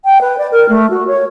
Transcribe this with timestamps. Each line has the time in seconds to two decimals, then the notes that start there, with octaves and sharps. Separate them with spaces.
0.05 G5
0.21 B4
0.38 D5
0.51 A#4
0.68 A3
0.90 F#4
1.07 C#5